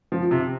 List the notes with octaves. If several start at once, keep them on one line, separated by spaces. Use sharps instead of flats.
F3
C3